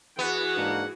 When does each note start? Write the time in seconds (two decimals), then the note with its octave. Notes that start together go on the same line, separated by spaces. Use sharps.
0.19 E3 B3 F#4 G#4 F#5
0.57 G#2 A#3 D4